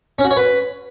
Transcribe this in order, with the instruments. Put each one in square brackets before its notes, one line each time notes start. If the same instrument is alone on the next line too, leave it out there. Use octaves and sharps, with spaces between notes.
[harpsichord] C#4
F#4
C#5
B4